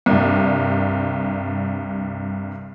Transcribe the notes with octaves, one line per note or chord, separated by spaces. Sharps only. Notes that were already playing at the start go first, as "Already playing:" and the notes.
C2 G2